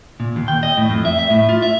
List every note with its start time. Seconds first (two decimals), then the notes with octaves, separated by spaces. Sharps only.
0.20 A#2
0.36 D#2
0.48 G5
0.63 D#5
0.77 A2
0.90 F2
1.05 E5
1.19 E5
1.30 A2
1.49 F4
1.62 E5